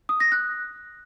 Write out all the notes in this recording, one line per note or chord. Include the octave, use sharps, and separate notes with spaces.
D#6
A#6
F#6